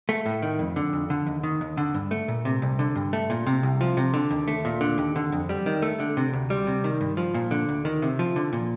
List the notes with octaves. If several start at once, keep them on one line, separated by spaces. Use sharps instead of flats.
A3
A2
D#3
F2
D3
F2
D3
D#2
D#3
D#2
D3
G2
A3
A#2
C3
C2
D3
G2
A3
A#2
C3
C2
F3
C3
D3
D#2
A3
A#2
D3
D#2
D3
F2
G3
D#3
A3
D3
C3
D2
G3
C3
D#3
G2
F3
A#2
D3
D2
D#3
C3
F3
D3
A#2